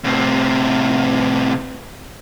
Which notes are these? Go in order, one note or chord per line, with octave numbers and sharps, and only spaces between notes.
A2 C3